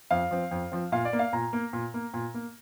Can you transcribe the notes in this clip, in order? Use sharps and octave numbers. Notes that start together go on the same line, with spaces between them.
F2 F5
F3 C4
F2
F3 C4
A#2 F5
D5
A#3
F5
A#2 A#5
A#3
A#2
A#3
A#2
A#3